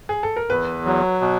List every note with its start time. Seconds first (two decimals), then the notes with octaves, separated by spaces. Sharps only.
0.09 G#4
0.23 A4
0.36 A#4
0.49 E2 B4
0.86 F#3
1.21 B2